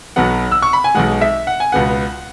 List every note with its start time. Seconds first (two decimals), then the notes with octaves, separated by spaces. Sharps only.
0.16 B1 B2 F#3 B3 F#5
0.52 E6
0.62 C#6
0.73 B5
0.84 G#5
0.95 B1 B2 G#3 F#5
1.21 E5
1.47 F#5
1.60 G#5
1.72 C#2 B2 B3 F#5